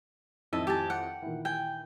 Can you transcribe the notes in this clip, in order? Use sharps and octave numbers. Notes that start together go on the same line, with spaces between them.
F2 A2 D#3 D#5 E5 A5
G4 G#5 A5
F#5 G5
A#2 D#3 E3
G5 G#5